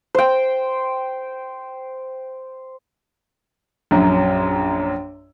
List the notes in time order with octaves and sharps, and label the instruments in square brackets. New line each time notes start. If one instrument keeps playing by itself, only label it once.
[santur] C5 G5
[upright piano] A#1 F#2 F#3